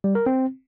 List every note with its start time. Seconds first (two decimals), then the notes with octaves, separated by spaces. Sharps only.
0.04 G3
0.15 A#4
0.26 C4